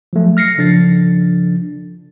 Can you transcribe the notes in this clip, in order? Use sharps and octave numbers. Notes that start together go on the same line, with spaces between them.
F3 F#3 A3
F6 A#6 C7 C#7
C#3 F3 D4 A4 A6